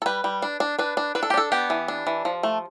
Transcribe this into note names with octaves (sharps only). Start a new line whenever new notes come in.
A4
G3 B4
G3
D4
D4
D4 B4
D4
D4 B4
A4
G4
D4 A4
B3 G4
E3
D4
E3
F3
A3